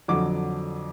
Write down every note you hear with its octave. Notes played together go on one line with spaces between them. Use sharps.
F2 D3 F#3 D6